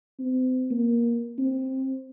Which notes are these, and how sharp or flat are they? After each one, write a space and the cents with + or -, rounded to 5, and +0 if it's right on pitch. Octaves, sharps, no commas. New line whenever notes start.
C4 -35
A#3 +15
C4 +10